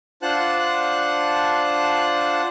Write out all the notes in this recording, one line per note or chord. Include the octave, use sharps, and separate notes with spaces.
D4 F4 C5 F#5 A5 F#6